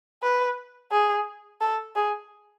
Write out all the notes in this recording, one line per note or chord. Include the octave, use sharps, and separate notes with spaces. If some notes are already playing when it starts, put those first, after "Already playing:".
B4
G#4
A4
G#4